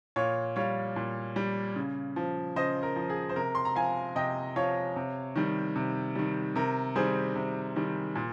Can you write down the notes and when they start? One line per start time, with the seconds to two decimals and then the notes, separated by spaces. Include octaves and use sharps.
0.16 A#2 C#5 F5
0.56 G3 C#5 F5
0.96 A#2
1.36 G3
1.76 C#3
2.16 F3
2.56 C#3 C5 D#5
2.83 A#4
2.96 F3
3.10 G#4
3.29 C5
3.36 C3 A#4
3.55 C6
3.65 A#5
3.76 F3 F5 G#5
4.15 C3 D#5 G5
4.56 F3 C#5 F5
4.96 C3
5.35 D#3 G3
5.76 C3
6.15 D#3 G3
6.55 C3 A#4
6.96 D#3 G3 G#4 C5
7.36 C3
7.76 D#3 G3
8.15 A#2